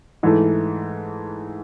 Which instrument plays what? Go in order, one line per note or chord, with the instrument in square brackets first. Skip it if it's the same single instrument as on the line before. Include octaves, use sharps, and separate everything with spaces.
[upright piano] G#2 E3 A3